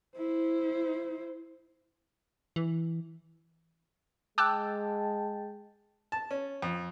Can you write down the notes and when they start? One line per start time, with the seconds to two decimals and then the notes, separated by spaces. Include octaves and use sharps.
0.17 E4 C5
2.56 E3
4.38 G#3 G5 A5 D6 E6 F#6
6.12 A5
6.31 C#4
6.62 F2